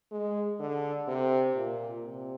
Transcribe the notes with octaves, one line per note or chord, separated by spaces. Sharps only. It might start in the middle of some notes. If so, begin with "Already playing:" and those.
G#3
D3
C3
A#2
C3